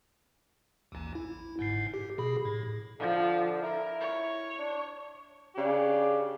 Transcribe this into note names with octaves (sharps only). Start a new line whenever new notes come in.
A1 D#2
E4
G1 G#2 C7
G4
B2 G#4 B5
A2
D3 F3
E4 A#4
C#5
D4
C#3 D4 G4